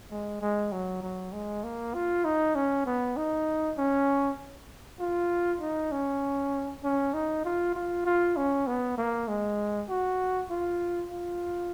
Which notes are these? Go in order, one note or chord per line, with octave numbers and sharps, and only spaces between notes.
G#3
G#3
F#3
F#3
G#3
A#3
F4
D#4
C#4
B3
D#4
C#4
F4
D#4
C#4
C#4
D#4
F4
F4
F4
C#4
B3
A#3
G#3
F#4
F4
F4